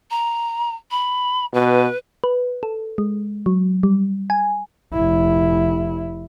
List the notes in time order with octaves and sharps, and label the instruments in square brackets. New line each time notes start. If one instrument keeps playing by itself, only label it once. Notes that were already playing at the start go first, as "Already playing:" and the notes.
[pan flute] A#5
B5
[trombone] B2 [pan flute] B4
[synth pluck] B4
A4
G#3
F#3
G3
G#5
[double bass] F1 E4